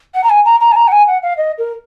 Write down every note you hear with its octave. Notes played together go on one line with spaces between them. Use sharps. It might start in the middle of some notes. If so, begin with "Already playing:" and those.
F#5
A#5
G#5
A#5
A#5
G#5
A#5
F#5
G#5
F#5
F5
D#5
A#4